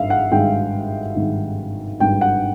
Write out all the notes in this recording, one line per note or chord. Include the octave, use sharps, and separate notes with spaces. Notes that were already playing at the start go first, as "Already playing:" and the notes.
Already playing: G#1 G2 E5 F5
F#5
G#1 G2 D#3 G#3 G5
G#1 G2 D#3 G#3
G#1 G2 D#3 G#3 G5
F#5